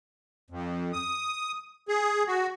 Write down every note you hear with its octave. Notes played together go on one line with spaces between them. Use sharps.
F2
D#6
G#4
F#4